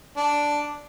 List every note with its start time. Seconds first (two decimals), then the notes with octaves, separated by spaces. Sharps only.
0.17 D4